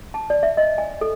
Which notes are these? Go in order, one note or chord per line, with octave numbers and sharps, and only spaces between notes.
A5
D5
E5
D#5
G#5
A4